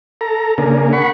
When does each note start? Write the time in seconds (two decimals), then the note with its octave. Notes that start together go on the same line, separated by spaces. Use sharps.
0.21 A4 A#5
0.58 C#3 A#3 D4 G#4 A#4
0.93 F#5 B5 C#6